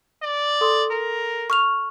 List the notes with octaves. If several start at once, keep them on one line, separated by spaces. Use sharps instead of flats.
D5
A4 C6 D#6
A#4
C#6 F6 F7